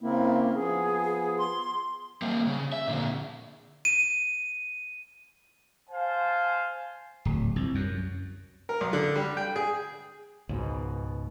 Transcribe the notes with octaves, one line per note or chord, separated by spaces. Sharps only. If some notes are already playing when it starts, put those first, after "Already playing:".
C#3 A#3 C4 E4
F3 B3 G#4
C6
G3 A#3
C#3
E5
A#2 D3
D#7
C5 F5 G#5 A5
D1
C2
F#2
A#4
B1
D3
G3
G5
G#4
C#2 G#2 B2